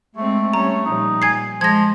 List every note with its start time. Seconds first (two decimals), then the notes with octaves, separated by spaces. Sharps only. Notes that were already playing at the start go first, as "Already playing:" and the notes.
0.15 G#3 A3 C4
0.53 G3 C#4 A#5
0.85 A#2 F3 G3 D#4
1.22 G#5 G#6 C7
1.61 F3 G#3 G#6 A#6